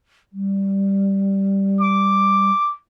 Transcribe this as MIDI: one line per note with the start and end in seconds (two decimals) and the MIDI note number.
0.33 2.50 55
1.81 2.76 86